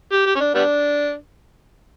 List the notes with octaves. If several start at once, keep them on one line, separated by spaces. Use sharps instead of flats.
G4
G4
C#4
D4
G3 B3 D4